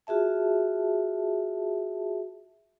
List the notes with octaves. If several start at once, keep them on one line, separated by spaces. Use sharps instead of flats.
F4 F#4 G#4 E5 A5